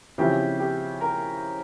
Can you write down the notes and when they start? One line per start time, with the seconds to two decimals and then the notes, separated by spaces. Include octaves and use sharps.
0.18 C#3 F3 C4 E4 G4
0.60 G4
1.01 A#4